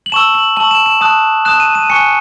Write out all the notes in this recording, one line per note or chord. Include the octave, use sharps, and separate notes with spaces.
F#7
A5 C#6 E6 E7
F#7
A5 C#6 E6 F#7
E7
E7
A5 D#6 F#6 E7
A5 D#6 F#6 E7
D#7
D#7
G#5 C#6 F#6 C#7